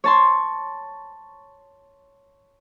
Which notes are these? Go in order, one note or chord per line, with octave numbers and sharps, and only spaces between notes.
C#5 A5 C6